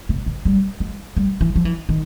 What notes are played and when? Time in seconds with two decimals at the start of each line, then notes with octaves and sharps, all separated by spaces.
0.09 C3
0.26 D3
0.45 G3
0.80 G#3
1.17 G3
1.41 E3
1.56 F3
1.65 E3
1.89 D#3